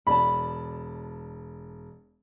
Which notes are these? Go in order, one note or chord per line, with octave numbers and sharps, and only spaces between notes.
E1 D5 A5 B5